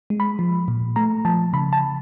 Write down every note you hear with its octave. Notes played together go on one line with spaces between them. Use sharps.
G#3
B5
F3
A#2
A3 A#5
F3 A5
C#3 B5
A5